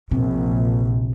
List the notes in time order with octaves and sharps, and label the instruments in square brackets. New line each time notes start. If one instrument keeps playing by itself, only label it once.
[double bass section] A#1 [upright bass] E2 C3